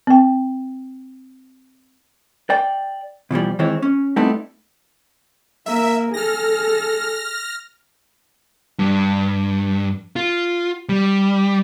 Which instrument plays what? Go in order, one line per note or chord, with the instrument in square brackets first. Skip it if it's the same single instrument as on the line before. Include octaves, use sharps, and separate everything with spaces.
[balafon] C4 G5
[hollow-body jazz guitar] D5 G5
B2 E3 F3 G3
D#3 E3 G#3 C4 E4 C#5
C#4
G3 A3 B3 C4 D#4 E4
[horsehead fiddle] A#3 A#4 [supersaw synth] E5
[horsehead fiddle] G#4 A4 [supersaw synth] F6 A#6
[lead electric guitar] G2
F4
G3